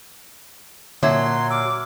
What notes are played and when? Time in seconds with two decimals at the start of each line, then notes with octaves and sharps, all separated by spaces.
1.03 A#2 D3 F#3 E5 C6 G#6
1.50 D6 E6 F6